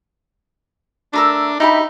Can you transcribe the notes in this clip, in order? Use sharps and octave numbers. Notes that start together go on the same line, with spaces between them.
A3 D4 A#4 E6
D#4 E4 G4 B5